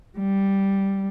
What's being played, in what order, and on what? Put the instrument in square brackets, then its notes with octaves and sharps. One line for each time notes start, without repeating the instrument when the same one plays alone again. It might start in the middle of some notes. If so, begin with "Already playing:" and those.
[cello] G3